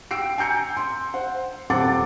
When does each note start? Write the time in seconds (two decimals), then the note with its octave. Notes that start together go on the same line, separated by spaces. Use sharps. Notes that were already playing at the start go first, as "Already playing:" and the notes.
0.11 G5 E6 C7 D7
0.38 G#5 A#5 G6 C#7
0.77 C6
1.14 C5 F#5
1.70 D#1 C4 A4 F#5 D6 A6